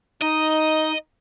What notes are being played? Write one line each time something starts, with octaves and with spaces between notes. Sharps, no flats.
D#4 D#5